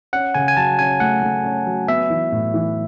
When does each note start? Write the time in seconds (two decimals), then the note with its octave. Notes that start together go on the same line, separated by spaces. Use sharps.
0.13 C#4 F#5
0.34 C#3 G#5
0.48 G#5
0.57 F#3 A5
0.79 C#4 G#5
1.00 A3 F#5
1.23 A3
1.44 C#4
1.66 F#3
1.88 B3 E5
2.10 E3
2.32 A2
2.54 E3